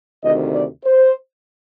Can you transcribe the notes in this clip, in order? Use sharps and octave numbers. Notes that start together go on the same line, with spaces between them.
D2 C3 D#3 D#5
D5
C5